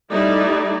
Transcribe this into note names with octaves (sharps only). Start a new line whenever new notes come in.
G3 A3 D#4 E4 D5